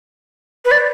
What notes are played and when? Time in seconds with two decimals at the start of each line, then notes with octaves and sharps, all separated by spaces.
0.65 B4
0.71 D5